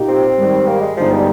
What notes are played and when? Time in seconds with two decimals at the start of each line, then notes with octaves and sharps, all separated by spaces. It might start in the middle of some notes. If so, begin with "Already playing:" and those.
Already playing: A#2 A#3 D#4 G4
0.08 C4
0.38 G#2 D#3 G3
0.67 A#3
0.81 G#3
0.97 G1 G2 D3 F3 G#3 D#4
1.12 G3